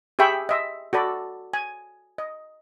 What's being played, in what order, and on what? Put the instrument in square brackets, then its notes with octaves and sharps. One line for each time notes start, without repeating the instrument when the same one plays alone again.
[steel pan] G4 G#4 E5 G5 B5 C#6
D#5 E5 C6
F#4 A4 D5 B5
G#5
D#5